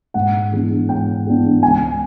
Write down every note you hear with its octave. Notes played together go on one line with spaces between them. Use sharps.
G#2 F#5
E3 G#3 B3 D4
G#2 G5
E3 G#3 B3 D4
C#2 G#5